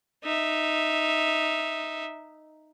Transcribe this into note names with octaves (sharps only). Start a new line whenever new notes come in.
D#4 E5